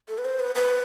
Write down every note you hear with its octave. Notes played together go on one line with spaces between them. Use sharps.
A4
B4
C5
B4
B4